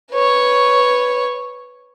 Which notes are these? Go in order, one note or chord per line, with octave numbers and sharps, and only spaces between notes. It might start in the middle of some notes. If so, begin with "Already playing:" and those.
B4 C#5